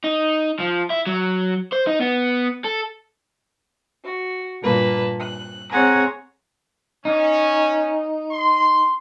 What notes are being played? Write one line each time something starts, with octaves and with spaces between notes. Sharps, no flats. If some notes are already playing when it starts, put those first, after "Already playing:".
D#4
F3
E4
F#3
C5
D#4
B3
A4
F#4
G2 A#2 A#3 B4 A5
F#6
C4 G#4 C#5 F#5 G#5 A#5
C#4 D#4
C6